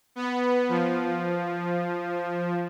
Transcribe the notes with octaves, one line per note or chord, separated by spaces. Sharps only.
B3
F3